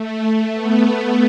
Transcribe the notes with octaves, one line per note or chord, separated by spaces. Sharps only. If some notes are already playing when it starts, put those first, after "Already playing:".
Already playing: A3
B3